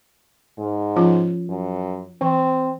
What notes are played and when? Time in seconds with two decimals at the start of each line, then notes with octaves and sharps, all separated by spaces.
0.58 G#2
0.96 F3 C#4 F4
1.49 F#2
2.21 E3 C4